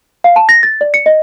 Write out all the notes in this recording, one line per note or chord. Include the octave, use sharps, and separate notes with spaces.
F5
A5
A#6
A6
D5
C#7
D#5